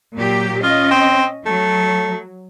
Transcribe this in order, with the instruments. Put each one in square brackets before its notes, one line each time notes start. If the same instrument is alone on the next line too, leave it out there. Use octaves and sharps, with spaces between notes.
[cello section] A#2 F#3 G4
[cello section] C#4 D#5 [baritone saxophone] F4
[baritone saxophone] C4
[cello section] F#3 [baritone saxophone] A3